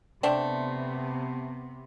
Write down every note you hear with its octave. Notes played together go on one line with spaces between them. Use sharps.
C3 A3 B3 C4 D4